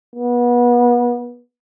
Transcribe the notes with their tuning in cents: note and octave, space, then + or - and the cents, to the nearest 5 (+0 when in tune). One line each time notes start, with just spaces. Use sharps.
B3 -30